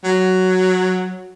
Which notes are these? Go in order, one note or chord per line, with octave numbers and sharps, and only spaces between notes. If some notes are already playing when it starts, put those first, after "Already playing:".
F#3